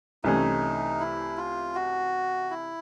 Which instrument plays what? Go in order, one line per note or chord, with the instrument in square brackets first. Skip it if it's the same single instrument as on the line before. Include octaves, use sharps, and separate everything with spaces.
[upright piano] C2 C3 E3 A3 C#4 [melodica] D#4
[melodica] E4
F4
F#4
E4